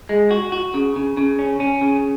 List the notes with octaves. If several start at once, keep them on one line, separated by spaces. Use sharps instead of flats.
G#3
F#4
F#4
C#3
C#3
C#3
C#4
C#4
C#3